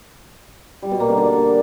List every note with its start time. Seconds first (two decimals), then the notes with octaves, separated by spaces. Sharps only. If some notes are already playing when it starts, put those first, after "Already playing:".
0.82 G3
0.91 B2
1.00 A#3
1.09 D3
1.18 D4